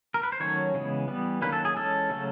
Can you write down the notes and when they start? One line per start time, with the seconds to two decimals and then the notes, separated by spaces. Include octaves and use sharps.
0.14 A#4
0.23 B4
0.32 C5
0.40 D#3 F#3 A3 C#4 C#5
0.74 C#3 E3 G#3 B3
1.08 E3 G3 B3
1.42 D#3 F#3 A#3 C#4 B4
1.52 A4
1.65 G#4
1.76 E3 G#3 C#4 A4
2.10 C#3 F#3 A3 C#4